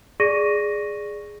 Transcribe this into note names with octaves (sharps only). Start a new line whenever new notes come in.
G#4 D5 C#6 A#6 D#7